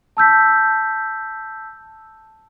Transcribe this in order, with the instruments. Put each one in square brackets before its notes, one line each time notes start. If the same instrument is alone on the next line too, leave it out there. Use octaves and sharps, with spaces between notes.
[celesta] A5 E6 G6 B6